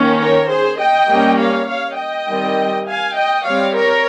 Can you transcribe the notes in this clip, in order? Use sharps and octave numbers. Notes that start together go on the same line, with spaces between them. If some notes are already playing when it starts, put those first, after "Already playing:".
Already playing: D#3 A#3 C#4
A#4 C#5
G#4 C5
D#5 G5
G3 A#3 C#4
C#5 F5
C#5 F5
D#5 G5
D#3 G3 C4
F5 G#5
D#5 G5
G3 C4 C#5 F5
A#4 C#5